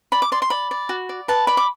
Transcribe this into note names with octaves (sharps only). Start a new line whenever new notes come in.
D5 B5
D6
D5 C6
C6
D5 B5
D5
F#4
D5
B4 A5
D5 B5
D6